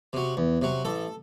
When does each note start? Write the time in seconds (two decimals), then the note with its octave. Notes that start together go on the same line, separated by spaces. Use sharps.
0.13 C3 F#3
0.37 E2
0.62 C3 F#3
0.85 A1 A4